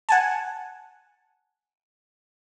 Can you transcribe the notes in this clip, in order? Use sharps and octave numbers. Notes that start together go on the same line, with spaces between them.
F#5 G#5 A5